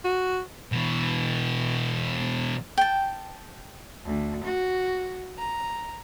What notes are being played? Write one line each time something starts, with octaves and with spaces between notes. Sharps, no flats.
F#4
B2 E3
G5 A5
D2
F#4
A#5